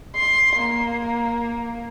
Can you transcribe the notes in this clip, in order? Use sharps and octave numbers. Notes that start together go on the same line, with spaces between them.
C6
A#3